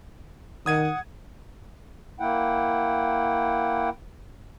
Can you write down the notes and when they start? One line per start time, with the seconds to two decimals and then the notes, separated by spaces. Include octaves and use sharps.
0.66 D#3 F#5 D#6 G#6 D#7
2.20 A#3 E4 F#5 G5